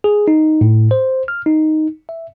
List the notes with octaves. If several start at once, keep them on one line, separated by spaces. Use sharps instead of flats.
G#4
D#4
A2
C5
F6
D#4
E5